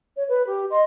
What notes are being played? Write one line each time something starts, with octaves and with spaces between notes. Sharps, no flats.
C#5
B4
G4
D#5 C6